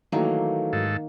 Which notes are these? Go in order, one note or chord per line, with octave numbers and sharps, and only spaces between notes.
D#3 E3 F#3 A3 A#3
G#2 A4